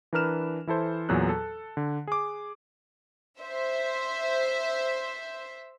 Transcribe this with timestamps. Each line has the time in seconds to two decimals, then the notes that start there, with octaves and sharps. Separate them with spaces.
0.13 E3 D4 A#4 B4 F6 E7
0.67 E3 E4 A4 C5
1.09 E2 A#2 F#3 G#4 F#6
1.29 A4
1.77 D3
2.08 G#4 D6
3.41 C5 E5